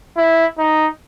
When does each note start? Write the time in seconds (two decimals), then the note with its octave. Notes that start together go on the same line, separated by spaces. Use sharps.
0.17 E4
0.59 D#4